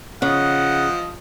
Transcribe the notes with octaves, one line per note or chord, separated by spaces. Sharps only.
C#3 F3 D#5 F#5